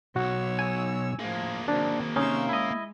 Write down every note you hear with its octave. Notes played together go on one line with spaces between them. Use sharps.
B1 F#4 C#5 E6
G#5
A2 F3 A#3 G#4
D#3 F#3 C4 D4
C3 D#3 C#4 D#4 C6 C#6 E6
G#3 E4 D#5